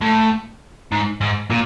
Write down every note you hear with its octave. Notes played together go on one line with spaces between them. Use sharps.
A2
G#2
G#2
A#2